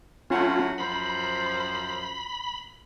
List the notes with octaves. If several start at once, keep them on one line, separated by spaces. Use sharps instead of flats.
A2 F#3 C#4 F4 F#5
F#2 F3 C5 B5